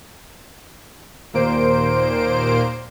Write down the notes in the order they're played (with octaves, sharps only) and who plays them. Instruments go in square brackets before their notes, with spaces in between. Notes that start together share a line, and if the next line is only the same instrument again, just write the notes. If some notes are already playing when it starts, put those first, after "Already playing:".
[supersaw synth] D#2 A#2 A#3 C5 D7